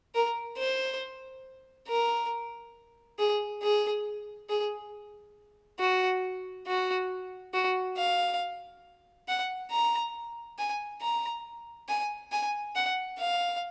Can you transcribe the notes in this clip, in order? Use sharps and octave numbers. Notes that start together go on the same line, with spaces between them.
A#4
C5
A#4
G#4
G#4
G#4
F#4
F#4
F#4
F5
F#5
A#5
G#5
A#5
G#5
G#5
F#5
F5